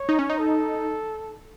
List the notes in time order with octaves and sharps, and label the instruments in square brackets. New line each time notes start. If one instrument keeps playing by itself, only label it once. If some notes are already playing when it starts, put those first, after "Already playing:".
Already playing: [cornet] C#5
[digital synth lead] D#4
C#4
D#4
[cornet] A4